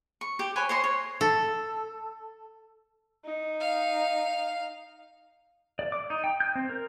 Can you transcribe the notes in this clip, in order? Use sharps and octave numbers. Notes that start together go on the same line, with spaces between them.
C#6
G4
B4 C#5 G#5 B5
C5 C#5 D#5 C6
C#5
A4
D#4
F5
D5
D6
D#4
G5
G6
C4
A#4